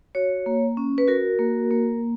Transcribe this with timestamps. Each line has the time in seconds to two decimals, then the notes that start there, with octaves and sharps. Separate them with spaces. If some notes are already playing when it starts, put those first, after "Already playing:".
0.15 F#4 C#5
0.46 A#3
0.77 C#4
0.98 B4
1.08 F#4 A#4
1.39 A#3
1.71 A#3